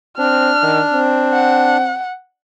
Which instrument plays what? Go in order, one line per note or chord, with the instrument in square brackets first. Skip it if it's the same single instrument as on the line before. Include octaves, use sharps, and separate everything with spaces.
[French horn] C4 [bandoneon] D4 [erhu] F6
[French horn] D#3
C4
[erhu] F#5